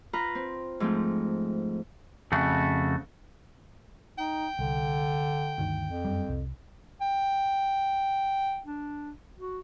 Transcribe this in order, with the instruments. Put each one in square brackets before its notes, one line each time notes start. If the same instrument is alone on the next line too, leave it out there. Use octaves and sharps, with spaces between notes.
[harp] F4 B4 A#5
C4
G#2 F3 A3 C4
[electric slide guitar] F2 C#3 A3 F#4
[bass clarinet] D#4 [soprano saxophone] G5
[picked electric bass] C2 [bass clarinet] D3
[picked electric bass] D2 G2 D#3
[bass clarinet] F2
[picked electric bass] F#2 G3
C2
[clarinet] G5
D4
F#4